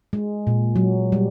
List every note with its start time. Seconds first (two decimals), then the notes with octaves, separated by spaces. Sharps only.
0.13 G#3
0.47 A#2
0.76 F#3
1.12 G3